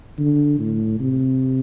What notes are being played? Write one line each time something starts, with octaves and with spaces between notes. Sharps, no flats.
D3
A2
C3